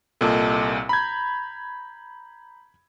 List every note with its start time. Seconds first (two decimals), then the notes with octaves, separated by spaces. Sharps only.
0.21 C2 A#2 A4 D#5 A5
0.89 A#5 B5 G6 G#6